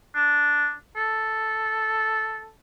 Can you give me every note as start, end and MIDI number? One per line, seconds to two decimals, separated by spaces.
0.15 0.71 62
0.96 2.49 69